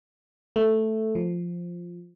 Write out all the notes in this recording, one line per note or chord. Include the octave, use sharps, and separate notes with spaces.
A3
F3